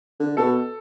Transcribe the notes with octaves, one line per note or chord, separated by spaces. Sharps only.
D3
B2 A4